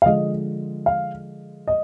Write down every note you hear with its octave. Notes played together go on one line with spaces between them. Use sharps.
F5
D3 F3 G#3 D#5
F5
D#5